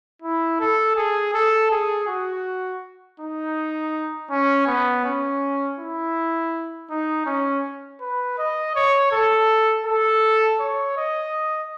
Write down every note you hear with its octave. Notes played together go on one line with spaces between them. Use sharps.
E4
A4
G#4
A4
G#4
F#4
D#4
C#4
B3
C#4
E4
D#4
C#4
B4
D#5
C#5
A4
A4
C#5
D#5